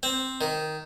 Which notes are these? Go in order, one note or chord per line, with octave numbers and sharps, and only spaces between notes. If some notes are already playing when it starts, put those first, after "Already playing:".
C4
D#3